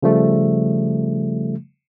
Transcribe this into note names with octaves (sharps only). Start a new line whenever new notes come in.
C#3 F3 G3 A3